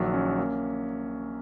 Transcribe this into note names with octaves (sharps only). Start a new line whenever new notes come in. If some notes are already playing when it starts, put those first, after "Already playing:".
Already playing: A#1 D#3 F#3
C#4
A#3